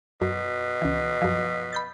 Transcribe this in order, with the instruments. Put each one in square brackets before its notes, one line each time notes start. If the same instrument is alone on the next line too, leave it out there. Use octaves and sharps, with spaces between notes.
[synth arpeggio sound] F#2 [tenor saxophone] B2
[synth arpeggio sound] C#2 E3
F#2 F3
B5 G6 A6